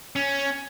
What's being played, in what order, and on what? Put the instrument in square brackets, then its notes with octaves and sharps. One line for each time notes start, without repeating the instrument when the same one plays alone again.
[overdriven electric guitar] C#4